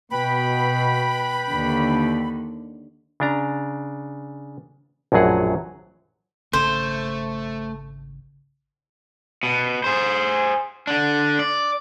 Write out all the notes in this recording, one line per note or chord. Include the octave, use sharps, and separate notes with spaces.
B2 B4 G5 B5
D#2 D3
C#3 D4 A#5
A#1 F#2 A2 F#3 G#4 F#5
G#1 C#3 A3 C5
B2
G#4 C5
D3 D4
D5